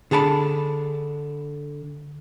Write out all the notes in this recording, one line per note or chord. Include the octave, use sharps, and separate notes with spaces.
D3 G#4 A5 B5